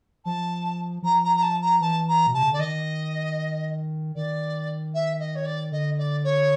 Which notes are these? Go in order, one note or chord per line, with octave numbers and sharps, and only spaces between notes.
F3 A5
F3 A#5
A#5
A#5
A5
A#5
E3 A5
A#5
B2
C3 A5
C#3
D3 D5
D#3 D#5
D#3 D5
E5
D#5
C#5
D5
D3 D#5
D5
C#5